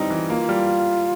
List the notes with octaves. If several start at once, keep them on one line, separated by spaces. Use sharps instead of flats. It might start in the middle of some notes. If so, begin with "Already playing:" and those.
Already playing: E3 G3 C4 D#4
E3
A#3 F4
G3